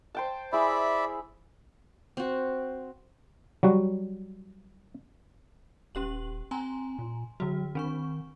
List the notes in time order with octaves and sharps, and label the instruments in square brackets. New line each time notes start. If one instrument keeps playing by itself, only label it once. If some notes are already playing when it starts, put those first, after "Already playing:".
[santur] C5 G5 A5
[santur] E4 G#4 [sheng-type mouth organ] D5 E5 B5
[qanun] C4 F#4
[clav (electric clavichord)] F#3 G3 F#4
[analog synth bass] D#1 [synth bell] C#4 G4 F#7
[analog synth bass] C4 [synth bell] G#5 A#5 C6
[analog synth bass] A#2
[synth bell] D3 F#4 [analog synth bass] F#3
[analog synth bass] D#3 [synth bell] C4 D4 C#6